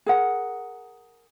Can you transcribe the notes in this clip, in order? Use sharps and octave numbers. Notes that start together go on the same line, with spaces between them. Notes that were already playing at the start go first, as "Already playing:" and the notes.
G#4 A#4 F#5